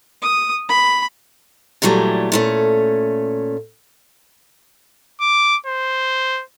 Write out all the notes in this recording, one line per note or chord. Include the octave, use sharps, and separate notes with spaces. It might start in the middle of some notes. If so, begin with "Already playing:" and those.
D#6
B5
A#2 E3 F#3 G3 A3
A#2 A3 C#4
D6
C5